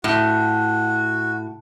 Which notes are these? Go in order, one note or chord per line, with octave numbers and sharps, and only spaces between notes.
A2 F#4